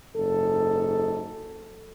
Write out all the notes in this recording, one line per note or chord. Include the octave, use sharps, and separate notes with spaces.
F#1 G#2 A4